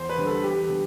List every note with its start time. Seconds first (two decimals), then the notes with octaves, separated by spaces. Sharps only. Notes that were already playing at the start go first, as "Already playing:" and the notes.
Already playing: E2 C5
0.09 B4
0.18 D3 G3
0.27 A4
0.44 E2 G4
0.69 D3 G3 B3